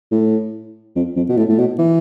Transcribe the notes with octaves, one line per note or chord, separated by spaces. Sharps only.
A2
F2
F2
B2
A2
A2
B2
E3